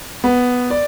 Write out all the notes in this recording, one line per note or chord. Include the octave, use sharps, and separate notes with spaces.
B3
D5